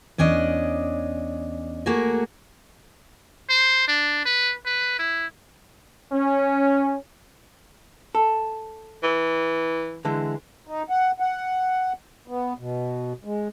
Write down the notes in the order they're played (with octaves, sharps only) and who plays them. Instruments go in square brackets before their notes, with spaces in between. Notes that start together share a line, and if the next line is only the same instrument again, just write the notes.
[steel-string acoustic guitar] E2 C#4 D4 D5 D#5
A3 A#3 F#4 G#4 A#4
[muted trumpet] C5
D4
B4
B4
E4
[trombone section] C#4
[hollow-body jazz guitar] A4
[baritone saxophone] E3
[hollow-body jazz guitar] D3 E3 G#3
[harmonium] D#4
F#5
F#5
B3
B2
G#3